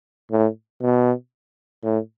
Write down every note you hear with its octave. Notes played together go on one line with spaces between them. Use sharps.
A2
B2
A2